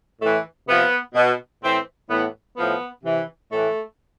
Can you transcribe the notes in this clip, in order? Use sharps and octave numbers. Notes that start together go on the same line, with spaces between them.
A2 E3 A3
C3 F3 B3
B2
A2 E3 C4
A2 E3 B3
A2 F3 B3
C3 E3
A2 E3 A3